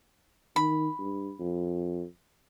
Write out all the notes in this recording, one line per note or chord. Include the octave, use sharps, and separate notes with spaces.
D#3 B5
G2
F2